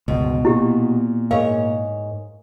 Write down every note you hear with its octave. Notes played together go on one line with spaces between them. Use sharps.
G1 C#2 B2
A#2 E4 G4
G#2 A#4 C#5 F5